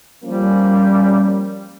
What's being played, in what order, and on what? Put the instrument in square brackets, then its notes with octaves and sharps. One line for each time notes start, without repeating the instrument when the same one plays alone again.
[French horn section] F3 A#3 C#4 [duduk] G3